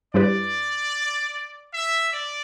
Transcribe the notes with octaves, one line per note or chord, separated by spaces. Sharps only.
G2 G3 E4 G4 B4 D5
E5
D5